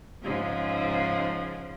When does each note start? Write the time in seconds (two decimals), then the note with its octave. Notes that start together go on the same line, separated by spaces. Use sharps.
0.22 G#2 C#3 F3